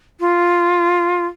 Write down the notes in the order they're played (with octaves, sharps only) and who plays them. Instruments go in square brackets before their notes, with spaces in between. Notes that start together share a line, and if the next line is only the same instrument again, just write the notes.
[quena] F4